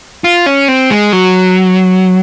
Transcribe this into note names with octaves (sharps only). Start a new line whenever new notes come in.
F4
C#4
C4
G#3
F#3